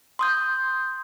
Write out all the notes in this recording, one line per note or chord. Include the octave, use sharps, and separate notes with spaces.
C6 D#6 G6